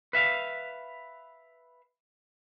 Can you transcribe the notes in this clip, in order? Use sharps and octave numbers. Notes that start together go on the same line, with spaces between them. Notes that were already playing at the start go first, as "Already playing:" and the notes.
B4 E5 F5